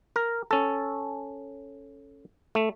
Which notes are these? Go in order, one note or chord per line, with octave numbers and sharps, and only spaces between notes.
A#4
C#4 A4
A3